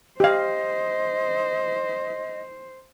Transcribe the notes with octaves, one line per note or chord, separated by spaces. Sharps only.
G4 C5 D#5 F5